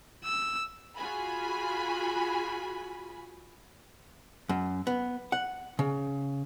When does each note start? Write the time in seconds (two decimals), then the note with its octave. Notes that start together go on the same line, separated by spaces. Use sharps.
0.24 E6
0.96 F4 F#4 G#4 G#5 B5
4.49 F#2
4.87 B3
5.32 F#5
5.79 C#3